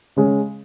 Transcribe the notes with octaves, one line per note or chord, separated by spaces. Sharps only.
C#3 G#3 C#4 G#4